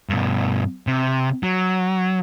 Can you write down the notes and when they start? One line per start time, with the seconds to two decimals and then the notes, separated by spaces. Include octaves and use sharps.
0.09 G2 B2
0.87 C3
1.43 F#3